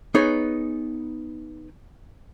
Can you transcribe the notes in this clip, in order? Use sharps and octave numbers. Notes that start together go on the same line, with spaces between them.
B3 D#4 G#4 B4 C#5